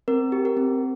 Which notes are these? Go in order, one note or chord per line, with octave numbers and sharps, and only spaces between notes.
C4 A#4
G4
A#4
C4